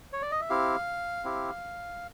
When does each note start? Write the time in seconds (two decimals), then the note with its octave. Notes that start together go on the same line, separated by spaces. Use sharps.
0.13 C#5
0.22 D5
0.31 D#5
0.41 E5
0.50 C4 E4 G4 F5
1.24 C4 E4 G4